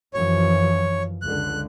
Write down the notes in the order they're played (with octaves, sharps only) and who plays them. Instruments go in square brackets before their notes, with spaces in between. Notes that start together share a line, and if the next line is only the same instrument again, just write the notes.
[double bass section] F#2 E3 F3 [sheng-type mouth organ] C#5
[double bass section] C#2 D3 [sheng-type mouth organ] F#6